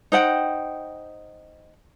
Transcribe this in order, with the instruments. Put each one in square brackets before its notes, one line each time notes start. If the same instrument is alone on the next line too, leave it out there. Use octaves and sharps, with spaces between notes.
[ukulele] D#4 C5 F#5 G5